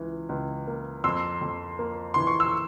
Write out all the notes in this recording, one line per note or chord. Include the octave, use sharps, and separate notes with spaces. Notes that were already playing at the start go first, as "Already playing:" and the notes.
Already playing: C#2 E3
C#2
A#3
F2 C6 E6
F2
A#3
E3 C6
C#6
E6